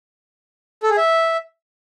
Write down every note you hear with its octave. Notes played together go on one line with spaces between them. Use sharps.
A4
G#4
E5